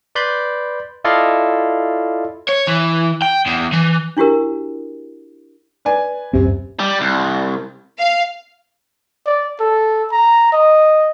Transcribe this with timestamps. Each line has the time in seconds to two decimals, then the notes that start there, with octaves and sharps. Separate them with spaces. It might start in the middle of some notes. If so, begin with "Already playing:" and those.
0.15 B4 D5 B5 C6 G6
1.04 E4 F4 A4 D5 D#5 F5
2.49 C#5
2.67 E3
3.22 G5
3.47 E2
3.73 E3
4.17 D4 E4 F#4 G4 A#4
5.85 B4 D5 G#5
6.33 D1 F#2 C3 C4
6.79 G3
7.01 C2
7.99 F5
9.26 D5
9.60 A4
10.12 A#5
10.53 D#5